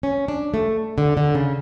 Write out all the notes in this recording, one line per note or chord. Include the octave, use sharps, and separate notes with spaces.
C#4
D4
A3
D3
D3
C#3